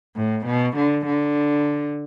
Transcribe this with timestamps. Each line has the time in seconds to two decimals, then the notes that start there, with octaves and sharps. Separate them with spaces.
0.16 A2
0.46 B2
0.76 D3
1.06 D3